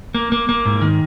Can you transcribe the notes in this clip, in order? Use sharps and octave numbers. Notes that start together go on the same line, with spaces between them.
A#3
A#3
A#3
G#2
D#3